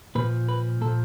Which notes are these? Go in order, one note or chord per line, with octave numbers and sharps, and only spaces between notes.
A#2 F3 B4
B4
A#2 F3 A4